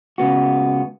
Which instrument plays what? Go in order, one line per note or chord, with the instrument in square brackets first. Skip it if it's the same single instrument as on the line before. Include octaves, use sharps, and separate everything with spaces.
[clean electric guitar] C#2 C#3 B3 F#4